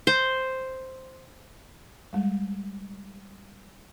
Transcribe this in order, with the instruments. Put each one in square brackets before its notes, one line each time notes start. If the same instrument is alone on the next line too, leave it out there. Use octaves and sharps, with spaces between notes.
[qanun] C5
[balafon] G3 G#3